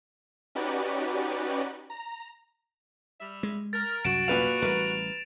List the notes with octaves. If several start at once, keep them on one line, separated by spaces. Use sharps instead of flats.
C#4 D#4 F#4 G4 B4 D5
A#5
G3 E5
G#3
A#4 A6
C2 F#2 F#4 D7 E7
A#2 B4 F5 F7
A1 G3 A#4 B4